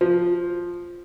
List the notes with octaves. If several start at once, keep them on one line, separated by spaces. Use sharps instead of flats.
F3